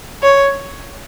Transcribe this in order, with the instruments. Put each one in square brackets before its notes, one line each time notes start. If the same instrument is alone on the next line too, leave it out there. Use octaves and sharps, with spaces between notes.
[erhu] C#5